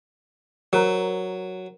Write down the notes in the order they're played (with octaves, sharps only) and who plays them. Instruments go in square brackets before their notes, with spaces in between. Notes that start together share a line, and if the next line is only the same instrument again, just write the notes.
[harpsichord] F#3 [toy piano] A#4 C5 A#5